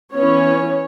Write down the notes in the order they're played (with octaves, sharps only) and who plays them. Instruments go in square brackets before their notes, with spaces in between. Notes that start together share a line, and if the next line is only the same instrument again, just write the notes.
[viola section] E3 B3 C#4 E4 C#5